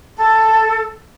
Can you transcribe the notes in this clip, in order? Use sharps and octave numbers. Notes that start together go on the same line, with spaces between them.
A4